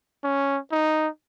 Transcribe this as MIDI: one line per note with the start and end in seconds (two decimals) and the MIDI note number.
0.24 0.58 61
0.72 1.08 63